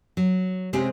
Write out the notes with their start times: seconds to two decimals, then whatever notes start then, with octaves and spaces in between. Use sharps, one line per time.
0.17 F#3
0.73 C3 G#3 C4 C#4 G4 G#4